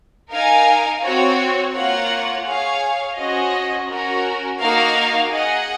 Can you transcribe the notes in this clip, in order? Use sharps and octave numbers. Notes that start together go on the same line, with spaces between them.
D#4 A#4 F5 G#5
C4 F#4 C#5
A#3 F4 A#4 C#5 F#5
G#4 C#5 F5
C#4 F#4 C5 D#5
C#4 F#4 A#4
A#3 D#4 F#4 A#4 F5
G#4 D#5 F#5